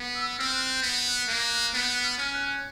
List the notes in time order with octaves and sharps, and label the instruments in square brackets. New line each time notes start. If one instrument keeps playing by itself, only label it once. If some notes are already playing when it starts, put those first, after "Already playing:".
Already playing: [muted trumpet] B3
[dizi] E6
[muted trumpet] C4 [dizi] F6
[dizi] F#6
G6
[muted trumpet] B3
[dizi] F#6
[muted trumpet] A#3
[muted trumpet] B3 [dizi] F#6
[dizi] G6
F#6
F6
[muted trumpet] C#4 [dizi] F6
[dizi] F#6
F#6